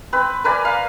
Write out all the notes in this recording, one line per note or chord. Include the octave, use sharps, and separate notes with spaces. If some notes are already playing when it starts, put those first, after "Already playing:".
C4 B4
A#4 B4 D5 G#5
F5